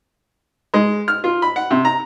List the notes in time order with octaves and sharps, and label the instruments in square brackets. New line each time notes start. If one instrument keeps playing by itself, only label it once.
[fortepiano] G#3
F6
F4
B5
F#5
C3
A#5